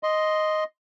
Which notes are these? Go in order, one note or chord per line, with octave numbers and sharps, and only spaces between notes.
D#5 C6